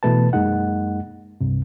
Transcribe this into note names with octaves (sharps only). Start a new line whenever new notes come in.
B2 E3 A3 B4 A5
F#2 G#3 A#3 D#4 F#5
C2 G2 C3